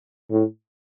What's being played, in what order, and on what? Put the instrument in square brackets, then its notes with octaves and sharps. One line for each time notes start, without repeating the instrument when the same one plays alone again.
[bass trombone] A2